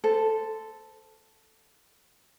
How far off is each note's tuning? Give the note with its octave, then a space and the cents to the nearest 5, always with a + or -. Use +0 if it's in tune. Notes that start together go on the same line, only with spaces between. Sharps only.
A4 +0 C5 -20